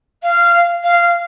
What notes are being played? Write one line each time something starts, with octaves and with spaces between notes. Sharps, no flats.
F5
F5